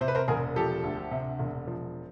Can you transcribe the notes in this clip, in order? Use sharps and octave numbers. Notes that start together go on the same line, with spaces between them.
C3 C5
B4
A#4 C5
E1 G#4 A#4
F3 G4 A4
D2
C3
E1
F3